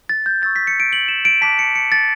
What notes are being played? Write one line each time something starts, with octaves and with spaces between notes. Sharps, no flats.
A6
G6
C#6 E6 G6 A6
B6
C#7
D7
F#7
E7
D7
A5 D6 F#6 B6
C#7
C#7
A6